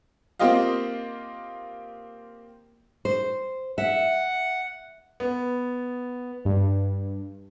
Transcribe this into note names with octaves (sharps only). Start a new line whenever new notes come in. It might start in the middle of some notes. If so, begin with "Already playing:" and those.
A#3 C4 F4 G4 D#5 F5
C5
E5 F#5
B3
G2